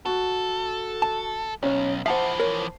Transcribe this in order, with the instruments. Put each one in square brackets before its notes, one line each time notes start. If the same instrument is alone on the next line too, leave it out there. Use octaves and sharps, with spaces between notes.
[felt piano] F#4 [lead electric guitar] A4
[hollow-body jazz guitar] A5
[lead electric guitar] B1 [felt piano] C#4 C#5
[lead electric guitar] E3 F3 [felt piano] C5 A5 C7 [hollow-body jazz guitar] E5 F#5
[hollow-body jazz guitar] A#4 C#5